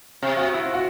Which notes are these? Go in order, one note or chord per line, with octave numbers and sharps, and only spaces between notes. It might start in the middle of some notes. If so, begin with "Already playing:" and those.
C3
C3 F#4
E4
F4
F#4